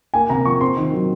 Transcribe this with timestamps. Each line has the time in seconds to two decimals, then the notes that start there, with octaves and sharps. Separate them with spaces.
0.14 A#3 G#5
0.30 C3 A#5
0.45 F3 C#6
0.61 C4 C6
0.77 D#3
0.93 F#3